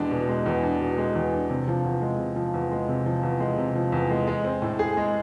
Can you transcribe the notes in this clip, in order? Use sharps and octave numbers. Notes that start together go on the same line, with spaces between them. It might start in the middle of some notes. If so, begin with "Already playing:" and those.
Already playing: E2 B2 G#3 D4
B2
G#3
E2
D4
B2
G#3
E2
D4
C3
F3
E2
G#3
C3
F3
E2
G#3
C3
F3
E2
G#3
C3
F3
E2
G#3
G#3
C4
A2
G#4
G#3